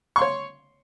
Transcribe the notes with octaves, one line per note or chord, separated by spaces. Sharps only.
C#5 C6 C#6